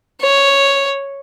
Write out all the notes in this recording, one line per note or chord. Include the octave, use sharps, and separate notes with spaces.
C#5